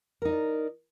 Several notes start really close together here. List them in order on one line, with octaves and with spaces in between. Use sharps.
A#4 D#4 D#5 D5